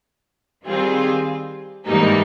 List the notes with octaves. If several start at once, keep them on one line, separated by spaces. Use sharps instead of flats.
D#3 G3 C4 F4 G#4
G#2 E3 G3 A#3 D#4